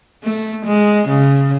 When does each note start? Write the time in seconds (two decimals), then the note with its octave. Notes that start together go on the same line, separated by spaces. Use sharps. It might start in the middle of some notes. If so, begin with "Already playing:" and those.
0.23 A3
0.66 G#3
1.09 C#3